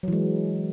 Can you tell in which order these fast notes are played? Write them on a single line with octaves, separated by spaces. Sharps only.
F#3 E3 G#3